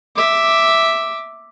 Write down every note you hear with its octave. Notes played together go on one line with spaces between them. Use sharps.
E5 D6